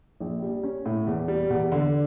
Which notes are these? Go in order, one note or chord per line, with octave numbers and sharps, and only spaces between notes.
A#1
G3
C#4
A2
E2
G3
E2
D3